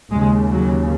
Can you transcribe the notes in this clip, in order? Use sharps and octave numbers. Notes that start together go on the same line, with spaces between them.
D#2 C#3 G#3
F#3